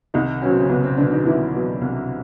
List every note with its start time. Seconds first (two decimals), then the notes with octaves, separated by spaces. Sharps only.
0.14 C2 D#3 D#4
0.42 B2 C#4
0.46 F#3 C4
0.59 C#3 C#4
0.69 C2 B3
0.83 C4
0.97 B2 D3 F#3 D4
1.11 D#3 D#4
1.25 C2 E3 E4
1.54 B2 F#3
1.81 C2